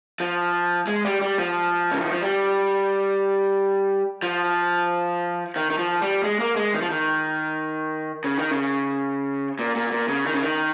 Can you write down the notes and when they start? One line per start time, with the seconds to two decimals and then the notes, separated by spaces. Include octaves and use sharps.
0.20 F3
0.87 G#3
1.05 G3
1.21 G3
1.38 F3
1.92 C#3
2.01 D#3
2.12 F3
2.21 G3
4.22 F3
5.56 D#3
5.71 D#3
5.78 F3
6.02 G3
6.24 G#3
6.40 A#3
6.56 G#3
6.74 D#3
6.82 F3
6.90 D#3
8.24 C#3
8.38 D#3
8.51 C#3
9.59 A#2
9.75 A#2
9.92 A#2
10.09 C#3
10.25 D#3
10.34 C#3
10.42 D#3